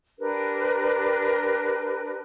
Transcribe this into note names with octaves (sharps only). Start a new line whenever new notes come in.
D4 G4 A#4 B4